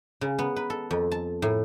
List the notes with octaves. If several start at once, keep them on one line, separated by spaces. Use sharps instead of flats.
C#3
B3
B4
A4
F2
A5
A2